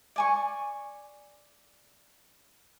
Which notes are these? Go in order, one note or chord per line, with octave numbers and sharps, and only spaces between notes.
D5 G#5 C#6